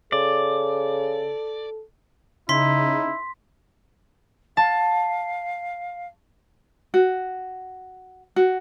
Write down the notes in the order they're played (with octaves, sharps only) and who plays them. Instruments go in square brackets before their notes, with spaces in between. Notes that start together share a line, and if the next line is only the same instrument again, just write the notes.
[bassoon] C#3 [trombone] A4 [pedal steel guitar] D5
[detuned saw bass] C#3 [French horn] D#4 [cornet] E4 [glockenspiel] C6 B6
[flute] F5 [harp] A5
[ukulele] F#4
F#4